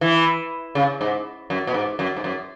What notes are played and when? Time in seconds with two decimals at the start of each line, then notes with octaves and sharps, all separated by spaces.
0.01 E3
0.75 C#3
1.01 G#2
1.50 F#2
1.67 B2
1.74 G#2
1.99 F#2
2.16 G#2
2.24 F#2